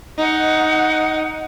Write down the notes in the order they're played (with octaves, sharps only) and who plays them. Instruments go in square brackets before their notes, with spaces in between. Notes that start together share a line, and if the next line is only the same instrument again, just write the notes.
[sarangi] D#4 [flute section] F#5